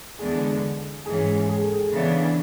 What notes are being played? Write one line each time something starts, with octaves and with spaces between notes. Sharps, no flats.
E2 D3 G#3 B3 D4 G#4
G#2 E3 G#3 C#4 G#4
G#4
A4
G#4
C#3 E3 B3 D4